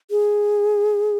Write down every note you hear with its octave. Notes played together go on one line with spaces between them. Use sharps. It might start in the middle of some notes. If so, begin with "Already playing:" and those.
G#4